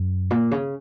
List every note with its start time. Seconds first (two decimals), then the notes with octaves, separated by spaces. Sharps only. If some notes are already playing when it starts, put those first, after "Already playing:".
Already playing: F#2
0.31 A#2
0.51 C#3